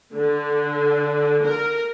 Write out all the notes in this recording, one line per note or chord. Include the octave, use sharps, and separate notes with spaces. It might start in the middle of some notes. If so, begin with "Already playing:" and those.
D3
A#4